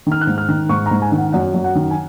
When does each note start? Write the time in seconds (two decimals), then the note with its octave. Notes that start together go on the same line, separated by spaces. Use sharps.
0.07 D#3 F6
0.21 F#6
0.27 G#2
0.38 F6
0.49 D#3
0.69 G#2 C#6
0.86 A#5
0.91 G#2
1.02 G#5
1.12 D#3
1.18 F#5
1.33 F#2 F#5
1.54 F#2
1.64 F#5
1.75 D#3
1.91 G#5